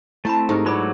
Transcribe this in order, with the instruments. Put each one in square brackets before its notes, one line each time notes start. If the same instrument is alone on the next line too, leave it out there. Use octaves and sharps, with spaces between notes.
[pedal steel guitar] A3 C4 [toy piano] E4 B5 [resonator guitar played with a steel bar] C5 A5
[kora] G#2 A#4 [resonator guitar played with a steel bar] D4 D#4 [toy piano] G4 A4
[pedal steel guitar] F#3 A3 D6 [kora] B3 C#5 [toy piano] F4 D5 B5